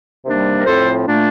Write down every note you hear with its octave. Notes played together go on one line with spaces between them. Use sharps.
C3 D#3 G3 A#3 D4
A#4
A2 F3 C4 A4 C5
A#2 A3 D4